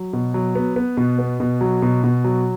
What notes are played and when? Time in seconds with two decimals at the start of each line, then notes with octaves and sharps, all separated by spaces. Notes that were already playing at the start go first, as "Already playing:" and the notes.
Already playing: F#3
0.13 B2
0.34 F#3
0.55 B3
0.76 B3
0.97 B2
1.19 B3
1.40 B2
1.61 F#3
1.82 B2
2.04 B2
2.24 F#3